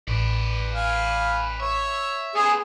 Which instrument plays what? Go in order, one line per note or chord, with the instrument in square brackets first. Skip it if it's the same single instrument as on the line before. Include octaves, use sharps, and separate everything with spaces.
[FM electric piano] A1 [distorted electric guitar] B4 D5
[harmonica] F5 G#5
[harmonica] C#5 [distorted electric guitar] E5
[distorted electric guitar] B3 C5 [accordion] G#4